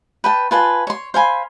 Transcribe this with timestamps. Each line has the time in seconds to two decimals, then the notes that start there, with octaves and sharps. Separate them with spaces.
0.24 B4 G5 A5
0.51 F4 B4 G#5 A5
0.87 C#5 C6
1.14 C5 F5 G#5 B5